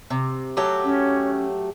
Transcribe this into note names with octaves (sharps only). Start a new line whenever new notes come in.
C3
F#3 A3 G4
C#4